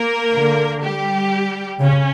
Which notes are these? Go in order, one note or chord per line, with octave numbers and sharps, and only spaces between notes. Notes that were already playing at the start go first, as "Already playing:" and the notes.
Already playing: A#3 A#4
D3
G3 G4
C#3 C#4